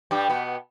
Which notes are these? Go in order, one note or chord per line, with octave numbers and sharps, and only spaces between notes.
G2 G3
B2 B3